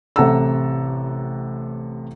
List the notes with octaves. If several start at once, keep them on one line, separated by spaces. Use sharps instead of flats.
A1 C3 A4 F#5 A#5 E6